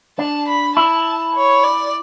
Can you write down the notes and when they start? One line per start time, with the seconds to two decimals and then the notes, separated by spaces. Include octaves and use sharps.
0.19 D4 A5
0.48 B5
0.76 E4 A5
1.35 C#5
1.63 D5